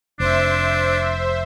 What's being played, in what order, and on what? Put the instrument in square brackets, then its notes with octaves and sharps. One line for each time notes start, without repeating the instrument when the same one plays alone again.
[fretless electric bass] F1 [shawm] D4 [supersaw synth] C5 E5